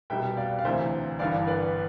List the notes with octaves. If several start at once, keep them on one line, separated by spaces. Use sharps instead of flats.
C2 B2 G3 E5 G5
D5 F5
F5
D2 C3 E3 C5 E5
G1 G2 E3 D5 F5
B4 D5